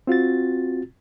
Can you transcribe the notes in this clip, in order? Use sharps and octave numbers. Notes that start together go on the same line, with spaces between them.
C4 F4 F#4 A6